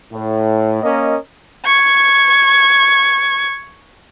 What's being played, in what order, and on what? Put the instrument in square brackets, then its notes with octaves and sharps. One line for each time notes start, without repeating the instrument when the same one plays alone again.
[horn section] A2
A#3 C#4 A#4 D#5
[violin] C#6 G#6